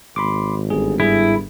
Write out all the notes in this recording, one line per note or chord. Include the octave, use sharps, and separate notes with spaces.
G#1 B5 C6 D6
G1 G#4
G#2 G3 E4 G#4